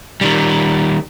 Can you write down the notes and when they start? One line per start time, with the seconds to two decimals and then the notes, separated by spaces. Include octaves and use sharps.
0.21 D#3 G3